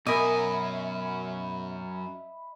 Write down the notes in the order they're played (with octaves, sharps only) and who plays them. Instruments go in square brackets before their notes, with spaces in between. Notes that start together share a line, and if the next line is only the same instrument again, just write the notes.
[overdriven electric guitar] F#2 G#5 [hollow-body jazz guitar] B2 [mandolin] A#4 D#6 [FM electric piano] D#5 E5 B5